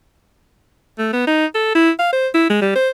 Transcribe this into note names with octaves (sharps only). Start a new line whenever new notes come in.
A3
B3
D#4
A4
E4
F5
C5
E4
G#3
G3
C5